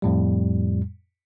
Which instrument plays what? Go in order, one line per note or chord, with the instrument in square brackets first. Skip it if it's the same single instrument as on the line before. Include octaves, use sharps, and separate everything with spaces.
[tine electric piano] F2 A2 G3